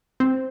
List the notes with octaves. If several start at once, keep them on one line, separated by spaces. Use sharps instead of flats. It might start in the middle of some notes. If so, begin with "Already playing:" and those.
C4